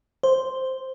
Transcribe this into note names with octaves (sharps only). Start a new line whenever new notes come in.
C5